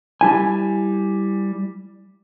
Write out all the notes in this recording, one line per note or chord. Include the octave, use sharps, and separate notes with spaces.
G3 E4 G#5